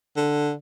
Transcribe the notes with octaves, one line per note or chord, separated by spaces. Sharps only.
D3